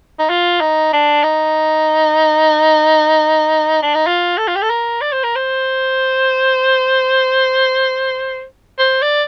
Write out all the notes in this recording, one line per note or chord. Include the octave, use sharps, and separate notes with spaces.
D#4
F4
D#4
D4
D#4
D4
D#4
F4
A4
F4
G4
A4
A#4
D5
C5
A#4
C5
C5
D5